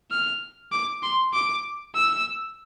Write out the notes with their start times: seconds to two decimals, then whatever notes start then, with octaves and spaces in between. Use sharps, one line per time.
0.11 F6
0.72 D6
1.02 C6
1.33 D6
1.95 E6